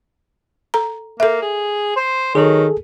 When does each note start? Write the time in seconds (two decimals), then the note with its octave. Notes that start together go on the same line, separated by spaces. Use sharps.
0.74 A4 A#5
1.20 A#3 A4 E5
1.42 G#4
1.96 C5
2.35 D#3 F#3 G#4 A4